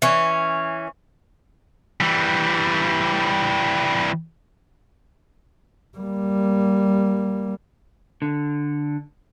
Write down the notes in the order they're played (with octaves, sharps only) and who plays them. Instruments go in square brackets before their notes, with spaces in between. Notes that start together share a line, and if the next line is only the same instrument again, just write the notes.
[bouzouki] E3 C#4
[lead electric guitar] E3 G3
[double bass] G3 A#3
[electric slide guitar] D3